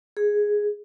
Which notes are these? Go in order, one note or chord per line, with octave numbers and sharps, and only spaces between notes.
G#4